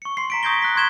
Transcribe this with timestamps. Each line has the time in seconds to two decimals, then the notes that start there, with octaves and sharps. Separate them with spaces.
0.02 C#6 C#7
0.17 C6 C7
0.30 A#5 B6 D7
0.43 C#6 D#6 G6 G#6 A#6 G7
0.62 F#6 B6
0.76 C6 C#6 G6 G#6 E7 G7